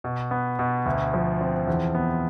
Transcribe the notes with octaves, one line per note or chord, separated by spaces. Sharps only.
B2
B3
B2
D2
F3
C4
E2
B3